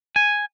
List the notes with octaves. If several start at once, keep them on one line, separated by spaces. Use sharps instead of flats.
G#5